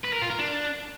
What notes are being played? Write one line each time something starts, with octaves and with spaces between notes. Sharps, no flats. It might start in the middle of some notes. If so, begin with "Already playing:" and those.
B4
A#4
F4
A#4
D4